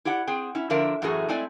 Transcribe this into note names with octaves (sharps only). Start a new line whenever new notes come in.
E4 G4 D5 F#5
C4 G#4 G5
C#4 E4
D3 F3 D4 A#4 E5
F#2 A2 E3 A3 F#4 G#4
G#3 A3 C4 E4 D5 G#5